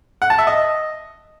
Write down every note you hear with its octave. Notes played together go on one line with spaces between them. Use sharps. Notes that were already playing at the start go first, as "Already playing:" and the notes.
F#5
A5
E5
D#5